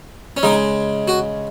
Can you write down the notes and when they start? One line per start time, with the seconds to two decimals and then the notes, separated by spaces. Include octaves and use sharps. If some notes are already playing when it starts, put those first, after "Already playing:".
0.37 C#4
0.43 C#3 G#3 D#4
1.08 F#4